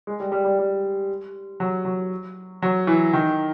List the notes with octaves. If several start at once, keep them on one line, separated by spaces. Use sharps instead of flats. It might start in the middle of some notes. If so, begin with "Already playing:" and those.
G#3
G3
G3
G3
G3
F#3
F#3
F#3
E3
D#3